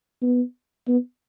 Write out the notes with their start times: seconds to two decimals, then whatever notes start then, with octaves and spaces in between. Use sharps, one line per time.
0.22 B3
0.88 B3